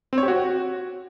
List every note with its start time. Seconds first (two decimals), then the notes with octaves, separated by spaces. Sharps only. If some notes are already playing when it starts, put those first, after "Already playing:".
0.13 C4
0.18 C#5
0.23 G4
0.28 F#4